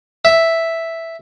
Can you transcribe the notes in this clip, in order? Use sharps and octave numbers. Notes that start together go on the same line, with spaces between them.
E5